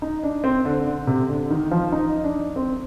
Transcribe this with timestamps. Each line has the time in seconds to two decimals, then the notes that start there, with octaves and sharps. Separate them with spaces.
0.02 D#4
0.24 D4
0.44 C4
0.65 D3
0.87 D3
1.07 C3
1.29 D3
1.50 D#3
1.71 F3
1.92 D#4
2.24 D4
2.56 C4